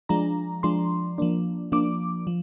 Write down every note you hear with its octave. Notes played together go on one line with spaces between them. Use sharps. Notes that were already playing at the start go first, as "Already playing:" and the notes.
F3 G#3 D4 A#5
F3 G#3 D4 C6
F3 A#3 D4
F3 A#3 D4 D6
F3